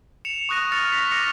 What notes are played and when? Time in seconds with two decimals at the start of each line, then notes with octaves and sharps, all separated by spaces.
0.25 C#7 E7 F7
0.49 C#6 D#6 F#6 A#6 D#7
0.72 F6 A6 A#6 C#7 F7
0.92 A#6 B6 F7
1.11 C#6 D6 F6 A#6 C#7 F7